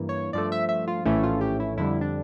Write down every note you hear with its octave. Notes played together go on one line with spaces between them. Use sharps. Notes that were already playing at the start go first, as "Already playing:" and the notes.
Already playing: G2 E3 A#3
C#5
G2 F3 A3 D5
E5
E5
F4
A#1 A2 E3 A3 C#4 E4
F4
G4
E4
F2 D3 G3 E4
D4